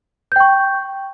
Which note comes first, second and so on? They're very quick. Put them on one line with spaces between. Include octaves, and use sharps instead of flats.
G6 G5 C#6